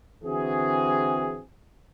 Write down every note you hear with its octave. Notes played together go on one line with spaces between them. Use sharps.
D3 E3 C4 F#4 G#4